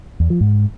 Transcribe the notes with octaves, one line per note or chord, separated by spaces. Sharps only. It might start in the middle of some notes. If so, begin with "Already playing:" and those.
E2
F3
G#2